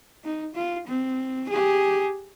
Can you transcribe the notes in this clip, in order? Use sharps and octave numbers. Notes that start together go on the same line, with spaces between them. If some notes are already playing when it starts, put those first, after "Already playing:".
D#4
F4
C4
G4 G#4